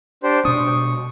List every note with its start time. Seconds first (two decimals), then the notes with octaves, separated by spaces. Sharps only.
0.23 D4 G4 C5
0.45 B2 D4 C#6 D#6